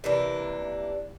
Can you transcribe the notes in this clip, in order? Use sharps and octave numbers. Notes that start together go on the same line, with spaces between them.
C3 E3 A#3 D4